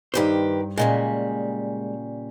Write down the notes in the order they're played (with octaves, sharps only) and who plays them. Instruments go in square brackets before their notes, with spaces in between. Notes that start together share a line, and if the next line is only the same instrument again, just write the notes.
[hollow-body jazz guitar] G2 C5 [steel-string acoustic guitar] D#3 G4 B4
[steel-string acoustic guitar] A#2 C#3 G3 [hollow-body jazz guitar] G#3